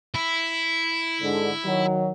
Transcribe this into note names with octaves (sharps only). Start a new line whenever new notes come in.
E4
G#2 D3
D#3 F#3